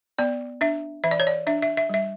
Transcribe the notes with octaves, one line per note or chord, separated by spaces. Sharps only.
B3 D5
D4 E5
E3 E5
D5
C#5
D5
D4 E5
E5
E5
G3 E5